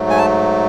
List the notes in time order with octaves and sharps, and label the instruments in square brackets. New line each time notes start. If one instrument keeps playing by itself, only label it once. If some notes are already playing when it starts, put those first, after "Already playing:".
Already playing: [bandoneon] G#2 F#3 A3
G#5
A5